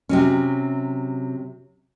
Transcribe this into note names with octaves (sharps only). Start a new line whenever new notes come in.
C3 F#3 C#4